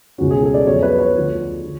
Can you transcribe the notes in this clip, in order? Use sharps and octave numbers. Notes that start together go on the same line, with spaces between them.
C#2 B2 G#3 C#4 F#4
G#4
A4
D5
F2 D3 F#3 B3 C#5
B4
C#5
D2 D3 F3 A3
D3